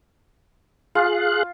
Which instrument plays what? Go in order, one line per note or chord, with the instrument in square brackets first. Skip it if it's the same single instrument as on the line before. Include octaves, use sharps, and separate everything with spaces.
[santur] F4 [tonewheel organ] G#4 F5 F#6